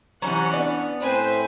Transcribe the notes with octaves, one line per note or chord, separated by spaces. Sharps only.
C3 E3 F#3 C#4 C5 F#5
B3 D4 D5
A2 C4 B4 C5 G#5